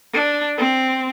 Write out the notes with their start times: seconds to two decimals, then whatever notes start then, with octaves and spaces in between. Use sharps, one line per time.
0.14 D4
0.58 C4